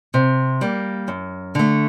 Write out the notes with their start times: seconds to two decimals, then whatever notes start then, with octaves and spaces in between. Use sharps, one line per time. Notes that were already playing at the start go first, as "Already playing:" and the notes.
0.14 C3
0.61 G3 A#3
1.08 F#2
1.55 D3 A3